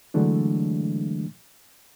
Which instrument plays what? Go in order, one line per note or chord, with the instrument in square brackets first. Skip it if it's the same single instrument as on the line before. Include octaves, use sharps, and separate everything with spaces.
[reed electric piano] D3 E3 F#3 G#3 A3 D4